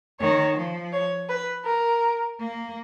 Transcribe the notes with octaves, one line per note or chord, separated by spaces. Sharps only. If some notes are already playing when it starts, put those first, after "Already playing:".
D#3 C#5
F3
C#5
B4
A#4
A#3